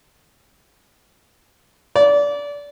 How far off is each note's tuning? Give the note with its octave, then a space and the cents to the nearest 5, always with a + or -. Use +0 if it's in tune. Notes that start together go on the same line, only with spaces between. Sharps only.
D5 -25